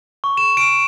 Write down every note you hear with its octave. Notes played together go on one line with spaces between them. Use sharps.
C#6
E7
D7